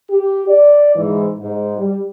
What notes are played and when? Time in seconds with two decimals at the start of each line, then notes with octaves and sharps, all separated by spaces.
0.11 G4
0.48 D5
0.96 G#2 E3
1.40 G#2
1.77 G3